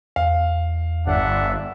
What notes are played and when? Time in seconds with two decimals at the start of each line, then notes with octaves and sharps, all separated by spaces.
0.16 E2 F5
1.07 G1 D4 E5 F#5